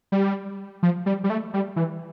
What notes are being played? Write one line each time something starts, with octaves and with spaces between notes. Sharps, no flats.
G3
F3
G3
G3
A3
G3
E3